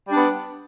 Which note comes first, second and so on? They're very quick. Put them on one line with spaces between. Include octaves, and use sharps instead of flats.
G3 D4 B3